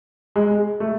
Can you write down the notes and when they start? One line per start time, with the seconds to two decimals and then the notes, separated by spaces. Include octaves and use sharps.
0.36 G#3
0.80 A3